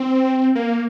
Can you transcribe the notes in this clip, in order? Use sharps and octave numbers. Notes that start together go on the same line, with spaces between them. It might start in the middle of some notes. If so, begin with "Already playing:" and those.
Already playing: C4
A#3